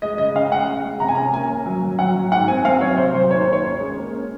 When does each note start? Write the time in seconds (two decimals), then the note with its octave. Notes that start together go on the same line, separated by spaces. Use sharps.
0.02 G#3 D#5
0.18 C#3 D#5
0.35 C#3 F5
0.52 G#3 F#5
0.68 G#3
0.84 G#3
1.00 C3 A#5
1.08 G#5
1.15 C#4 A#5
1.33 A#3 G#5
1.50 C#4
1.66 F#3
1.83 F#3
1.99 F#3 F#5
2.16 F#3
2.32 G#2 F#5
2.48 C4 G#5
2.65 C4 F5
2.81 F#3 C#5
2.97 C3 C5
3.14 F#3 C5
3.31 D#2 C#5
3.41 C5
3.47 D#2
3.53 C#5
3.64 C#4
3.79 G#3
3.97 A#3
4.13 C#4